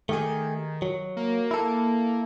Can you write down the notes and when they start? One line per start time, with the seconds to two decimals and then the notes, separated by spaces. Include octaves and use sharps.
0.09 D#3 A3 G4 G#4
0.82 F#3
1.17 A#3
1.51 E4 A4